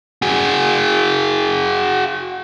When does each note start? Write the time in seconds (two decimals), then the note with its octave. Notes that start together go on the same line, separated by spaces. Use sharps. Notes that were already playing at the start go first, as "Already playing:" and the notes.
0.22 F#4 G#4